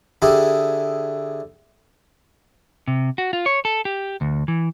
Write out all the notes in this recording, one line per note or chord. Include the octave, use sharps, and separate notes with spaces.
D3 E4 G4 G#4
C3
F#4
F4
C#5
A4
G4
D2
E3